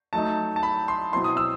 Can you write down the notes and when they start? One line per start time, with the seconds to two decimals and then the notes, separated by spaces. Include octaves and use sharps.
0.13 F#3 A3 D#4 A5
0.56 A5
0.63 B5
0.88 C6
1.12 B2 F#3 C4 E4 C6
1.24 D#6
1.37 E6